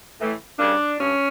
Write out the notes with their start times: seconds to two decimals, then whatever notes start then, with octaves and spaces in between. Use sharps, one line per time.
0.19 A2 E3 A3
0.59 C#3 G3 A#3 D4
0.99 G2 C#4